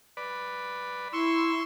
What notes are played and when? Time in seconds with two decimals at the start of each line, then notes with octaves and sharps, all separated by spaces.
0.17 B4 D5
1.13 E4 C6 C#6 E6